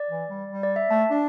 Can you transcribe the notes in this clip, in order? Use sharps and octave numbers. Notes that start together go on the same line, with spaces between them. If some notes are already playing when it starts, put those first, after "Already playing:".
Already playing: D5
E3
G3
G3
D5
E5
A3 A5
D4